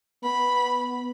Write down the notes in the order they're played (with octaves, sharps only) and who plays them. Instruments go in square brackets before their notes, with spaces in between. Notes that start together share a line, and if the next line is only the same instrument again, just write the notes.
[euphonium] B3 [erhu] B5